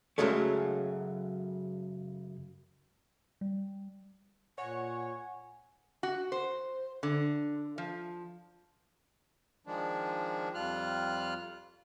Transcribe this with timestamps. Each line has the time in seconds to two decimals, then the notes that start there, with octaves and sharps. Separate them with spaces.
0.18 F#2 C#3 F#3 G#3 A3
3.41 G3
4.58 A#2 C#5 F#5 G#5
6.03 F#4
6.32 C5
7.03 D3
7.78 F3
9.67 D#3 F3 G#3 D4
10.54 F2 G3 F4 F6 F#6